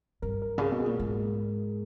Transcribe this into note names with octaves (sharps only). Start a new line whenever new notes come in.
G2 A#4
A#4
C#3 G#4
B2
G#4
A#2
G#2